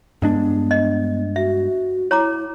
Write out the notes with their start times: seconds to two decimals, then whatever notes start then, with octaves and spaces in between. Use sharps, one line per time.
0.22 G2 G#3 B3 D4
0.71 D#5
1.36 F#4 E5
2.11 E4 C#5 A#5 D6